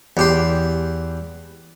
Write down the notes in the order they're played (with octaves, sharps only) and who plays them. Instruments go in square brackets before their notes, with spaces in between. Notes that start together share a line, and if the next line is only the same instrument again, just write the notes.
[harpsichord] E2 G4 C6